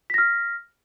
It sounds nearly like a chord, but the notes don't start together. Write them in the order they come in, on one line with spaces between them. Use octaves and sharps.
B6 A#6 F6